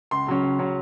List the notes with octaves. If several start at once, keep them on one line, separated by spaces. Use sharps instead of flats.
C#2 C6
C#3 F#3 C#4
C#2
C#3 F#3 C#4